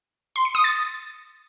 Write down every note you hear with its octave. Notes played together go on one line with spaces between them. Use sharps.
C6
C#7
D#6
A6